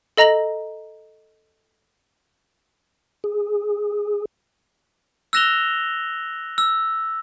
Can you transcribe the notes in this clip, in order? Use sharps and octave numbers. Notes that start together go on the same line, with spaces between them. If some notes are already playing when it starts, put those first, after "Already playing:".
A4 D#5 A#5 A#6 F#7
G#4
E6 F#6 A#6 E7 F7 G7
E6